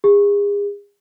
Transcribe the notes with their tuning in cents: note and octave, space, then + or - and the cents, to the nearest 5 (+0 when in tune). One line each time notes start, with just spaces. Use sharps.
G#4 -35